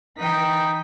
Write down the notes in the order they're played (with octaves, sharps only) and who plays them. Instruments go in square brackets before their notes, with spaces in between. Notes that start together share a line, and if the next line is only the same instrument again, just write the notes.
[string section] E3 G5 B6 [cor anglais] D#4